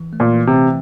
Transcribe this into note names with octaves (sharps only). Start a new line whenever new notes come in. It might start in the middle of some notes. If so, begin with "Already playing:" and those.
Already playing: E3
A3
A#2
E3
C3
C4